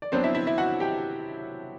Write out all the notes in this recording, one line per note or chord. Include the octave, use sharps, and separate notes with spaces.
D5
F#3 B3 C4 D4 C5
E4 E5
E4 E5
E4 E5
F#4 F#5
G4 G5